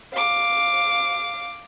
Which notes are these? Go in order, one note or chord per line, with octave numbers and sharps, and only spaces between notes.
F5 D6